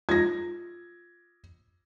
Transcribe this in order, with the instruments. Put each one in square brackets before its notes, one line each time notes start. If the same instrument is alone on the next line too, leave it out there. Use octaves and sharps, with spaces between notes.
[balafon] F4 [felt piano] G#6 A#6